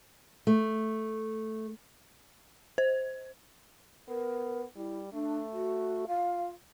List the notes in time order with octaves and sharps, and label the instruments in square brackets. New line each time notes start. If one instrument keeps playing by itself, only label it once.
[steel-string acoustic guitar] A3
[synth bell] C5
[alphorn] B3 [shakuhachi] A#4
[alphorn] G3 [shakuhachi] E4
[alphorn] A3 [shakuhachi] D4
[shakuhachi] F#4
[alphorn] F4 [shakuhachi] F5